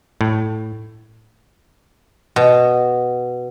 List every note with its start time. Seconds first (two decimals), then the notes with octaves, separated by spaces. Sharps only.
0.21 A2
2.36 B2